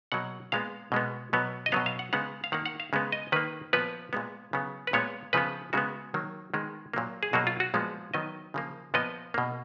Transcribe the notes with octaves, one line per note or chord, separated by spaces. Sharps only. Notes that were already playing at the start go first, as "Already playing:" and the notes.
B2 F#3 A#3 F#5
A#2 G#3 B3 F5
B2 G#3 B3
B2 F#3 B3
D#5
B2 F#3 B3 F5
F5
F#5
C#3 G#3 B3 F#5
F5
D#3 A#3 F#5
F#5
F5
C#3 G#3 B3
D#5
D#3 A#3 B4
A#2 F3 B3 B4
A#2 G#3 B3
C#3 F#3 B3
B4
A#2 G#3 B3 C#5
C#3 F3 B3 B4
C#3 G#3 B3 F#4
D#3 F#3 A#3
D#3 G#3 B3
A#2 F#3 A#3
G#4
B2 F#3 A#3 F#4
F4
F#4
A#2 F3 G#3 B3
D#3 F#3 B3 D#5
C#3 F3 A#3
A#2 F3 B3 D#5
B2 A#3